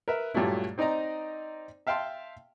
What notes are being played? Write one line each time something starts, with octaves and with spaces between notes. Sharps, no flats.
A#4 B4 E5
G2 A#2 F#3 A3 E4
C4 D#4 D5 D#5 A#5
E5 F5 G5 A5 C6